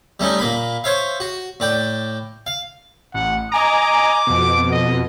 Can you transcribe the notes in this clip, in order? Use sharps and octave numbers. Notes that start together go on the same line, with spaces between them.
G3 A3 C#4 D#4
A#2 A#3 B5
C5 C#5 E5 F5
F#4
A2 D5 G5
F5
A1 F#5
D#5 G#5 A#5 D6
F2 B2
D#5